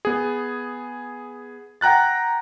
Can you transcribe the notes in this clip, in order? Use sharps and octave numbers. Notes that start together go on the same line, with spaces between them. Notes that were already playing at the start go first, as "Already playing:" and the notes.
B3 G#4
F#5 G5 A#5 F#6 A6